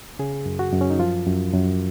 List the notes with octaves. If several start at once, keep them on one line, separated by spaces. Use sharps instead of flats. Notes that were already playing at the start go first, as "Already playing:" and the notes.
C#3 G#4
F#2
F#4
F#2
C#4
D#4
F3 F4
F#2
F#2